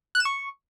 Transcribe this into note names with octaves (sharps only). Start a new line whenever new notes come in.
F#6
E7
C#6